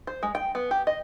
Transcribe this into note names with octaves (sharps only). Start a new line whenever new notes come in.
C5
G#3
G5
B3
G4
D#5